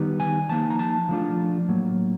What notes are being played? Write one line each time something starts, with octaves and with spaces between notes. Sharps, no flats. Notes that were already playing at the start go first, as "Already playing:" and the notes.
Already playing: D#3 G3 B3 D#4
G#5
F3 A#3 D#4 A5
A#5
A5
F3 A3 D4 F4
A2 F#3 A#3